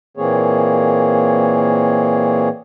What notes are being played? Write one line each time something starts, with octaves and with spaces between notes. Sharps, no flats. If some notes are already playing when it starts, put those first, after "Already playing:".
A#2 E3 A#3 C4 G#4 C#5